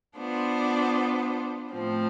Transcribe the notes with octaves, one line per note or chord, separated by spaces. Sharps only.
B3 D4 F4 C5
A2 F3 C4